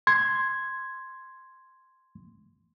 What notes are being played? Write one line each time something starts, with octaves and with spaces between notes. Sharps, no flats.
C6 G#6